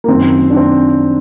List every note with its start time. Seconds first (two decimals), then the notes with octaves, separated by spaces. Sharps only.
0.04 A#3
0.08 F#2 D#3 C4
0.50 D4
0.57 C4